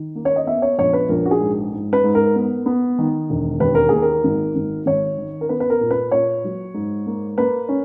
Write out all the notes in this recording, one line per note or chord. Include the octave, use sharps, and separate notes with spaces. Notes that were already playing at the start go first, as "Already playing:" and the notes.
Already playing: D#3
A#3
C#5
D#5
B3 E5
C#5
A#1 C#5
B4
A#1 A#4
F#4
G#4
G#2
G#2
B4
G#2
A#4
B3
B3
D#3
E1
D#2 B4
A#4
A#3 G#4
A#4
G#1
G#1
G#1 C#5
D#3
A#4
B3 B4
B4
A#4
A#2
B4
A#2 C#5
F#3
G#2
A#3
A#3 B4
C#4